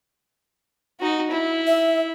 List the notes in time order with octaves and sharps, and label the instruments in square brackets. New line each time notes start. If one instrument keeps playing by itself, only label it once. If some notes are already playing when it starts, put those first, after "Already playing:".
[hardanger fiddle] D#4 F#4
E4
[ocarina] E5